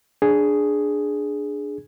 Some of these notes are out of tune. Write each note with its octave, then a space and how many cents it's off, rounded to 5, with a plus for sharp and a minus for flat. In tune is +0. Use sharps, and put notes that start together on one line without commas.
D4 +0 G#4 +0